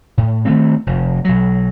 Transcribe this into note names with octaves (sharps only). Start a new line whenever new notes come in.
A2
D#3 A3 C4
F1
B1 F#3